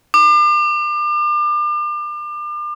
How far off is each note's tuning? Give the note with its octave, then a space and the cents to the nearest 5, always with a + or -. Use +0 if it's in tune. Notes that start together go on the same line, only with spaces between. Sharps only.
D6 +35